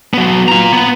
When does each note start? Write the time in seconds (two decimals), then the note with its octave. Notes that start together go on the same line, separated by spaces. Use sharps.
0.14 F#3 B3
0.48 F4 A#5
0.72 B3